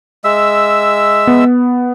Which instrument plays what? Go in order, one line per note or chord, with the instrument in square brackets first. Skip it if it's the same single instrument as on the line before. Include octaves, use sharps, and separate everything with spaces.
[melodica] G#3 E5 E6
[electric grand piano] B3